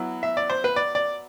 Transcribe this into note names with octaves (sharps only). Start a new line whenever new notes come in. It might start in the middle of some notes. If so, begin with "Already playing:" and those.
Already playing: F#3 B3 E4
E5
D5
C5
B4
D5
D5